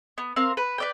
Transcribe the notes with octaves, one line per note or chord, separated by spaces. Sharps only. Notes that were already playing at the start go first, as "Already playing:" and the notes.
B3
C4 A#4 F5
B4
B4 D5 G5